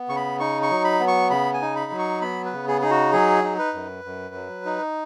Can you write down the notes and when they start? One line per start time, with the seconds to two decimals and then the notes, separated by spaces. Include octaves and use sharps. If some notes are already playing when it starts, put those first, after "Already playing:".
Already playing: B3
0.09 C#3 C#6
0.16 B5
0.40 D#4 C#6
0.62 C#6
0.70 F#3
0.84 B5
1.00 B3
1.08 C#6
1.30 C#3 B5
1.54 G#5
1.62 D#4
1.76 B5
1.91 F#3
1.99 C#6
2.21 B3 B5
2.45 B4
2.53 C#3
2.68 G#4
2.81 D#4 G#4
2.91 F#4
3.13 F#3 G#4
3.44 D#4
3.59 B4
3.74 F#2
4.04 F#2
4.35 F#3
4.65 D#4